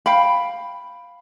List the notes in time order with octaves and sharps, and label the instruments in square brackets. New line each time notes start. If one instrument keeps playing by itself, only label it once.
[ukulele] F5 G5 B5